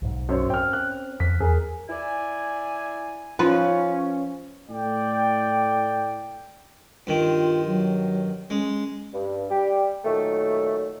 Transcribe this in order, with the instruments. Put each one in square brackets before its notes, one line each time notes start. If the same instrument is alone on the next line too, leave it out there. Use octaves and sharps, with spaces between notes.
[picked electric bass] B1 G#2
[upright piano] F#2 C5 C#5
[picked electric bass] C4 C#4 [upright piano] G5 F6
[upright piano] F#6
[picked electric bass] F2 [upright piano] B6
[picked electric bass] E2 [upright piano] G#4 A#4
[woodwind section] E4 D5 G#5
[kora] F3 B4 [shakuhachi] C#4
[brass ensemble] A2 A3 D5 G5
[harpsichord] G2 D#3 [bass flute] F4
[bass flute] F#3
[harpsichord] G#3 [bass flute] C#4
[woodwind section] G2
G3 G4
A#2 D#3 F#3 A3